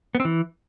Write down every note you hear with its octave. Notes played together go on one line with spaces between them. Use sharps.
B3
C4
E3